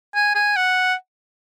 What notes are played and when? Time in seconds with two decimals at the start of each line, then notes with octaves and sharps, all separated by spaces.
0.15 G#5
0.35 G#5
0.56 F#5